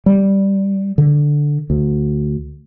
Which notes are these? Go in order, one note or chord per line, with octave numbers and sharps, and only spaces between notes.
G3
D3
D2